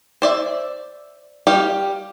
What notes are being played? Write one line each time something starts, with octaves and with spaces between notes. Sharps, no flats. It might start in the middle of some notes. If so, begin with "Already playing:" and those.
C5 D5 E5
G3 G4 F5